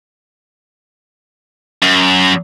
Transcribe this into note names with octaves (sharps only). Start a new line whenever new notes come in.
F#2